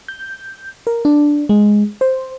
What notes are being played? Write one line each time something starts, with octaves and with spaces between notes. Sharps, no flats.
G6
A#4
D4
G#3
C5